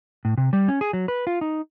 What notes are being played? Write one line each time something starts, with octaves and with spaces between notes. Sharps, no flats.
A2
C3
G3
C#4
G#4
F#3
B4
F4
D#4